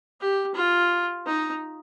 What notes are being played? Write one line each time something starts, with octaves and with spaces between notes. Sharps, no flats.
G4
F4
D#4